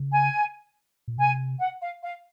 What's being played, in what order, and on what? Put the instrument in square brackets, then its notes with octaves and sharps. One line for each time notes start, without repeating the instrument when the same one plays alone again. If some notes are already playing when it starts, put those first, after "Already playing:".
Already playing: [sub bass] C#3
[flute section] G#5
[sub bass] A#2
[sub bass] C3 [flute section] G#5
[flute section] F#5
F5
F5